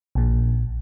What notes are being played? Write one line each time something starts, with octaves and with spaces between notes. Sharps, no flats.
A#1 A#2